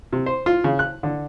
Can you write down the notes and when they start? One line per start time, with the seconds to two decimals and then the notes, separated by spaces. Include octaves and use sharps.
0.13 C3
0.26 C5
0.46 F4
0.64 C#3
0.79 F#6
1.03 D3